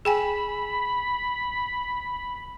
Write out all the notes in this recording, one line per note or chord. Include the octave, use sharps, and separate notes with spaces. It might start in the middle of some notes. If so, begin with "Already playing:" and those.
G#4 G5 G#5 B5